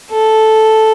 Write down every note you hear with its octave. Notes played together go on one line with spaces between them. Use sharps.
A4